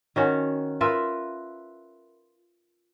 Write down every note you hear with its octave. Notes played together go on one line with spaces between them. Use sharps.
D#3 C#4 F#4
F4 A#4 B4 E5